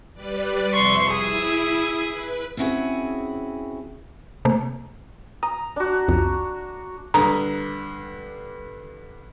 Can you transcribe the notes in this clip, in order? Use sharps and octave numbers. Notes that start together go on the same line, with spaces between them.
G3 B4 D5
F2 C3 E5 C6 C#6
E4 G#4 E5
B4
C4 C#4 E4 F#4 G#4
C3 A3 A#3
A#5 D#6
D4 F#4
C2 F2
G2 D3 A#5 D#6